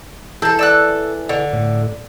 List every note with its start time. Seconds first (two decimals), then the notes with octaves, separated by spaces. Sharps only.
0.42 E3 C4 A4 A5
0.59 D5 E6 F#6
1.29 D3
1.53 A2